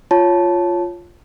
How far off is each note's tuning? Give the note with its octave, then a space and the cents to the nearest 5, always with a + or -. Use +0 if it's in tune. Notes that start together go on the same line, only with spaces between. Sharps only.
F4 +0 C#5 +0 A5 -5